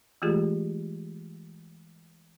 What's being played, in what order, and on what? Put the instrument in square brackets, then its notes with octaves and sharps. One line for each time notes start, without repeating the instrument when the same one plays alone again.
[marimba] E3 G#3 A3 F4 G4 G#4